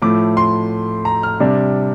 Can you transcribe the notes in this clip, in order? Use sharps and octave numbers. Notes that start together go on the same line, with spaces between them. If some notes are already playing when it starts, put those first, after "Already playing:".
A2 F3 A3 D6
C6
A#5
F6
C3 G3 D4